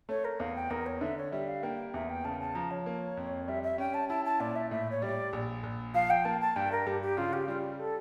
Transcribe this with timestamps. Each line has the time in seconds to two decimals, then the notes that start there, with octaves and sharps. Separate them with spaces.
0.09 A3 C#5
0.24 A#4
0.40 E2 F5
0.55 G5
0.70 E2 A#4
0.86 C#5
1.01 D3 E5
1.17 C#5
1.32 G3 E5
1.48 F5
1.63 A#3 G5
1.94 E2 E5
2.09 G5
2.24 C#3 A5
2.40 A5
2.55 F3 A#5
2.71 C#5
2.86 A#3
3.17 F2
3.48 G3 E5
3.63 E5
3.78 C#4 G5
3.94 A5
4.09 E4 A5
4.25 A5
4.40 A#2 D5
4.55 E5
4.71 A2 E5
4.90 C#5
5.02 G3 D5
5.33 A#1
5.63 A#1
5.94 F3 F5
6.10 G5
6.25 A#3 A5
6.41 A5
6.56 G2 G5
6.72 A#4
6.86 G2 G4
7.02 G4
7.17 C#3 F4
7.33 G4
7.48 G3 F4
7.64 G4
7.79 A4